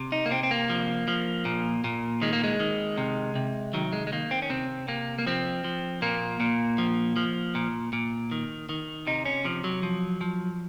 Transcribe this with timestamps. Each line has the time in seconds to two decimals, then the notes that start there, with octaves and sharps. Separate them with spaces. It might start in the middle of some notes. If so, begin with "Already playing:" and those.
Already playing: C3
0.12 D#4
0.26 A#3
0.31 C3 C4
0.43 C4
0.51 A#3
0.70 F3
1.08 F3
1.45 A#2
1.84 A#2
2.22 D#3 G#3
2.33 A#3
2.44 G#3
2.60 D#3
2.98 C3
3.35 C3
3.74 D#3 F#3
3.93 G#3
4.07 G#3
4.12 D#3 A#3
4.31 C4
4.42 C#4
4.50 C3 C4
4.88 C3 A#3
5.18 A#3
5.26 F3 C4
5.64 F3
6.02 A#2 A#3
6.40 A#2
6.78 F3
7.16 F3
7.55 A#2
7.93 A#2
8.31 D#3
8.69 D#3
9.07 C3 D#4
9.25 C#4
9.45 C3 F3
9.64 F#3
9.83 F3
10.21 F3